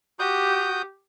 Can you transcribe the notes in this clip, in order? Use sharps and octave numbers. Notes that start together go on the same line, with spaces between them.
F#4 G4 D#6 G6